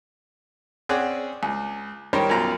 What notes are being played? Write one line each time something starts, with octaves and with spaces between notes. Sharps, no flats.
C4 C#4 G#4 D5 F#5
C#2
D#3 G3 A#4 C5 C#5
B1 F#2 B2 F4 A#5